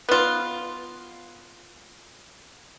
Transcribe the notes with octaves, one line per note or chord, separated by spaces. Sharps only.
B3 F4